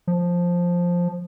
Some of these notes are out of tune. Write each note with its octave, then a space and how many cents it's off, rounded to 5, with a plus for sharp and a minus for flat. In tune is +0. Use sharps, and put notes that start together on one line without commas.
F3 +5